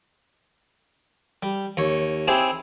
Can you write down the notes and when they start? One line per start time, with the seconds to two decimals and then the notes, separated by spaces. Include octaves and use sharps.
1.43 G3
1.77 D#2 C#5
2.28 C4 E4 G4 G#4 G#5